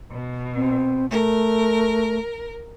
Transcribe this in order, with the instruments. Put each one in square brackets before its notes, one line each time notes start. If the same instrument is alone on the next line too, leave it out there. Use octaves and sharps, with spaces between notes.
[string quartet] B2
[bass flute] C4
[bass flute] A3 [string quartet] A#4